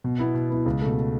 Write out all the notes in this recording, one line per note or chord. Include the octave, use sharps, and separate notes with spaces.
B2
B3 E4
B2
B3 E4
C#2
B2 A3